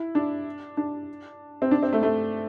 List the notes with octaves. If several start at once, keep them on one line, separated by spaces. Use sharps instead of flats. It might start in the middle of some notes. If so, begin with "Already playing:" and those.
Already playing: E4
D4
D4
C4
D4
C4
A3
A3